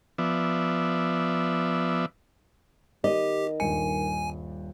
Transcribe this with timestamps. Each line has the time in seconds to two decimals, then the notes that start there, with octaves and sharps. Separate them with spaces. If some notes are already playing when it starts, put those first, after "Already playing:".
0.18 F3 B3 D5 E5
3.04 D#3 G4 D#5
3.60 D#1 G2 G#5 C#7